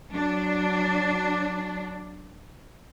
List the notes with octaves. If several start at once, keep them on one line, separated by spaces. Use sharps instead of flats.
F#3 D4